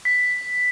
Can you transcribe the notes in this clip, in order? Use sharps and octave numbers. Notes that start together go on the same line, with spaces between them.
B6